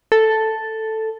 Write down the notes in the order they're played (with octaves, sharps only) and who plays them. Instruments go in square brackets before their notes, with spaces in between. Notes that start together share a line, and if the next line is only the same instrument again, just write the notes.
[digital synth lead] A4